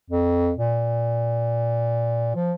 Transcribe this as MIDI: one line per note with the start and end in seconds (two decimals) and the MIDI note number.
0.10 0.51 41
0.57 2.32 46
2.35 2.52 53